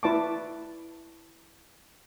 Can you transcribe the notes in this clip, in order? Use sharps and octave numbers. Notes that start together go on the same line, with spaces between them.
E4 B4 D5 A5 C#6 D6